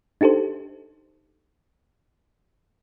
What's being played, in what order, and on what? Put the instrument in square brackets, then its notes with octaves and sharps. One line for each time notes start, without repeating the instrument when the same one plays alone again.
[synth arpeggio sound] D4 D#4 G4 A4 C5